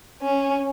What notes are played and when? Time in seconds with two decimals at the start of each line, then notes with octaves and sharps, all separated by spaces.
0.23 C#4